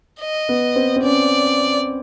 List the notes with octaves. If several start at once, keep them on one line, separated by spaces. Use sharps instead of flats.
D#5
B3
C4
C4
C#4 D5